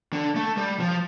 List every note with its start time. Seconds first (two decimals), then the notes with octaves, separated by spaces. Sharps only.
0.13 D3
0.36 A3
0.58 G3
0.80 F3